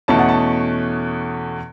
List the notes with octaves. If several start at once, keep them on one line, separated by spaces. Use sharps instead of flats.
E2 B2 A3 C#4 A5
F#5
A5